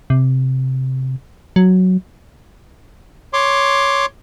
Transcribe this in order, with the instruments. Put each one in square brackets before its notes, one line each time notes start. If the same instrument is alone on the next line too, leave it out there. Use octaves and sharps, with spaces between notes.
[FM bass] C3
F#3
[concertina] C#5 C6 D6